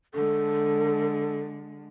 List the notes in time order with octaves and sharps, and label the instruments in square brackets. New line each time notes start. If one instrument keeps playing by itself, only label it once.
[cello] D3 G#3 [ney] A4